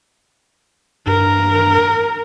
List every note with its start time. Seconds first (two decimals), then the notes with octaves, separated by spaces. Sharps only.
1.07 G2 A#4